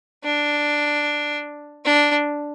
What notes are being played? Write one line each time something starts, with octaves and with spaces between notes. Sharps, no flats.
D4
D4